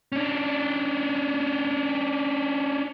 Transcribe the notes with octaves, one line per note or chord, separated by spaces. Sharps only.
C#4 D4